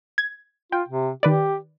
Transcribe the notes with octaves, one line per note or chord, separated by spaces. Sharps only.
G#6
F4 G5
C3
D#3 G4 B4 D5